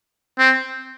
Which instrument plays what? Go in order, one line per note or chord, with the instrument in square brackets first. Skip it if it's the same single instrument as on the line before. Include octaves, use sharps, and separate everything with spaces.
[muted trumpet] C4